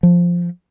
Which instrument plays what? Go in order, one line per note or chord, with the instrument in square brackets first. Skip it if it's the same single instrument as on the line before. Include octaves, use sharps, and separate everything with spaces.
[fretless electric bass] F3